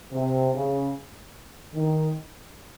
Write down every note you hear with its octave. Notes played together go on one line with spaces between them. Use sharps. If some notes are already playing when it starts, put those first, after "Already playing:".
C3
C#3
D#3